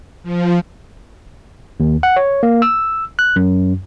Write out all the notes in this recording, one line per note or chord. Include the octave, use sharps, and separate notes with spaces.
F3
D#2
F#5
C#5
A#3
E6
F#6
F#2